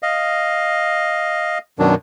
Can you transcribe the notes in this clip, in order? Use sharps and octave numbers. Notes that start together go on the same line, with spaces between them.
D#5 F5
F#2 B2 D#3 F#3 D4